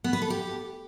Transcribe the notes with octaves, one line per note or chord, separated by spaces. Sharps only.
B3
B4
A4
G4